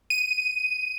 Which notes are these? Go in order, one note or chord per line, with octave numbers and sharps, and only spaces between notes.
D#7